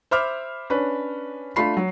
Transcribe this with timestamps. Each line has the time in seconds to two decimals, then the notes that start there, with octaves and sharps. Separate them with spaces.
0.11 C5 E5 B5 D6 F6
0.70 C#4 D4 B4
1.56 A3 D4 F4 B5 C7
1.77 F#3